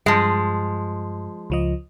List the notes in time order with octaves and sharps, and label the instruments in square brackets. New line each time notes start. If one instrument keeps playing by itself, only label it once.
[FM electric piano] G2 [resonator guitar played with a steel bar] F3 G#3
[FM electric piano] C#2 F3 D#5